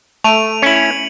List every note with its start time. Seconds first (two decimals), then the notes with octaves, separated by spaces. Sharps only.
0.24 A3 D7 D#7 F7
0.62 C#4 E4 C#7 F#7